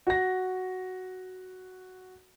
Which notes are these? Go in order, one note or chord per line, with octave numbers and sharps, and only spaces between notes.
F#4 A#6